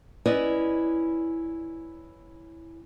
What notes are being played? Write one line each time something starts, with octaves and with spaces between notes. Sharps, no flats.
C#4 E4 B4 D5 D#5